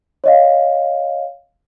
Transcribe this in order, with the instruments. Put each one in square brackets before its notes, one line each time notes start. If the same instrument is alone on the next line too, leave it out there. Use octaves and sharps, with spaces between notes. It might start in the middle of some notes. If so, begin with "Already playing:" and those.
[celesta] C#5 D#5 F5